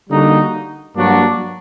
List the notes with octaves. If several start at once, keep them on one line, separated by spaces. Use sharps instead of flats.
D3 G3 A#3 D#4 F#4
G2 F#3 A#3 D4 F#4